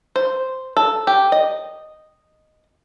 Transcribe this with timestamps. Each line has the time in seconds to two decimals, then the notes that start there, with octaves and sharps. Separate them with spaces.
0.16 C5
0.77 A4
1.07 G4
1.32 D#5